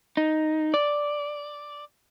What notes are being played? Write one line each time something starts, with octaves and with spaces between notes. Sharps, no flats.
D#4
D5